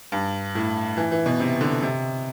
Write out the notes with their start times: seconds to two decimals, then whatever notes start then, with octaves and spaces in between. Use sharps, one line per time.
0.12 G2
0.55 A2
0.97 E3
1.11 E3
1.26 B2
1.40 C3
1.61 D3
1.82 C3